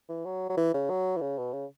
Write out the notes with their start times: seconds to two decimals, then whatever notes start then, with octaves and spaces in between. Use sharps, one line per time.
0.09 E3
0.25 F#3
0.50 F#3
0.57 E3
0.74 C#3
0.90 F#3
1.17 E3
1.21 C#3
1.38 B2
1.53 C#3